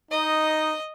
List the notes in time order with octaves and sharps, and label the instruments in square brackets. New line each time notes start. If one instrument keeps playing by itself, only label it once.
[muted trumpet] D#4 [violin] D#5